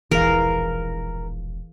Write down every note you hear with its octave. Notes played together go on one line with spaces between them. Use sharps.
E1 A#1 E3 G#4 A#4 F5